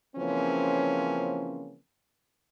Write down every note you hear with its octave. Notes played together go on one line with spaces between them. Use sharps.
C#3 E3 F3 A#3 C4 C#4